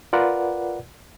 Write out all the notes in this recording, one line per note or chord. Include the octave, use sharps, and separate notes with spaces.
F4 A#4 B4 D5 F#5